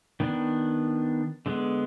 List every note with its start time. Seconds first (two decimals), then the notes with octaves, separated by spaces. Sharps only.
0.20 D#3 B3 D4
1.46 D3 G#3 B3